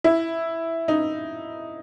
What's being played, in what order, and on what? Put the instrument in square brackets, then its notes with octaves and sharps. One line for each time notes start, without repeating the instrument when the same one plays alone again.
[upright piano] E4
D#4